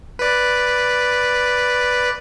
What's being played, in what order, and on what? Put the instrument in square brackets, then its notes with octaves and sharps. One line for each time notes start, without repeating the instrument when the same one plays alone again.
[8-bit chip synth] B4 D5